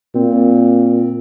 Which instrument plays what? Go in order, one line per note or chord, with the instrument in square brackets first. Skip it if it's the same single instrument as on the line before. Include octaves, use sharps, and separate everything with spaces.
[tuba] A#2 [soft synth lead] C4